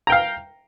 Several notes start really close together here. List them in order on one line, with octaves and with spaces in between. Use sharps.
A#5 G5 F5